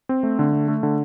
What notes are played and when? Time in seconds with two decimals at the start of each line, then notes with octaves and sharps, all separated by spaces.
0.09 C4
0.23 A3
0.39 D3
0.53 A3
0.68 A3
0.83 D3